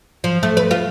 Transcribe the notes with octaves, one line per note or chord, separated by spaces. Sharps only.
F3
A3
B4
F4